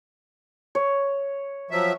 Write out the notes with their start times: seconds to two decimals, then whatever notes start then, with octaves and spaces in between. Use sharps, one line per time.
0.75 C#5
1.71 F3 F#3 E5